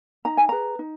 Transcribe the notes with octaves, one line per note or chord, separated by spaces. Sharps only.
D#4 A#5
G#5
G#4 B4 A#5
D#4